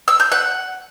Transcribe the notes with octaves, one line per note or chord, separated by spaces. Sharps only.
E6
G6
F#5